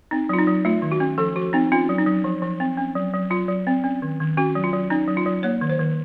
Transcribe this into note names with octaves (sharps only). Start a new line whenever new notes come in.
C4 D#4
F#3 F4
D#4
F#3
A3 F4
D#3
F#4
C#4
F3 A4
F3 F#4
C4 D#4
C#4 F4
F#3
D#4
F#3
F3
F3
C4
C#4
F#3
F#3
F#3 F4
F#3
C4
C#4
D#3
D#3
C#4 F#4
F#3
F4
F#3
C#4 D#4
F#3
F4
F#3
A#3 C#5
D#3
C5
D#3